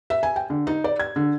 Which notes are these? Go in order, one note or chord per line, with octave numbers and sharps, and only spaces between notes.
E5
G#5
G5
D3
D#4
D5
G#6
D3